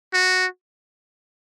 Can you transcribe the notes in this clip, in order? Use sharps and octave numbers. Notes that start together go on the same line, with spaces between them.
F#4